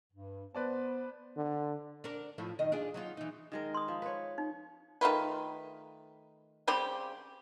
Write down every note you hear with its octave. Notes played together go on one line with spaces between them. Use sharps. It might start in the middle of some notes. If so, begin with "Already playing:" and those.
G2
B3 B4 C5 D5 A5
D3
D4 A#4
A2 F3 E4
F#2 D#3 D#5
D4 F4 G#4
F#3 D#4 F4
E3 D#4
D#3 G#3 A#4
C6 D#6
F3
B4 C#5
D#4
D#3 A3 F4 B4
C#3 G3 C4 G4